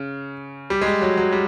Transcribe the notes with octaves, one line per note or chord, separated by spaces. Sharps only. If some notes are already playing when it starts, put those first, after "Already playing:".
Already playing: C#3
G3
G#3
G3
F#3
F#3
G3